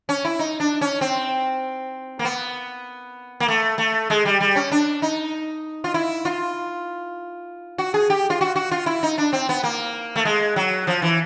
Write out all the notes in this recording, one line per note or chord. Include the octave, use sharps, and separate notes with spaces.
C#4
E4
D#4
D4
C#4
C4
A#3
B3
A#3
A3
A3
G#3
G3
G3
C#4
D4
D#4
F4
E4
F4
F#4
G#4
G4
F4
F#4
F#4
F4
E4
D#4
D4
C4
B3
A#3
A3
G#3
F#3
F3
E3